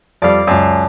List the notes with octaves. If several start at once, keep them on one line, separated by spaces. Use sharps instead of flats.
F2 G3 D5 F5
C#2 F#2 A5